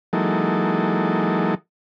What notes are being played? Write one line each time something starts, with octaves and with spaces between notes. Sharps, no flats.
E3 F#3 G#3 A#3 D#4 A4